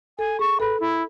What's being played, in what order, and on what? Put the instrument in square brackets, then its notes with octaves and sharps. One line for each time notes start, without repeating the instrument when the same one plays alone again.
[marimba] A4 [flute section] G#5
[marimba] G#4 [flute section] C#6
[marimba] A4 [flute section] B4
[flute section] E4